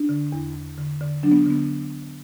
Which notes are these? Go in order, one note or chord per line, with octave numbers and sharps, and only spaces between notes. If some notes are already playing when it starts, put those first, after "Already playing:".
Already playing: D4
D3
E2
E2
D3
D3
F#3 D4
B3
D3 B3